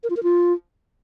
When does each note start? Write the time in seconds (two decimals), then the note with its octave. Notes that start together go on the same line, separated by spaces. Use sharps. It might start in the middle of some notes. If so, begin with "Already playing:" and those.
0.03 A#4
0.10 F4
0.17 A#4
0.23 F4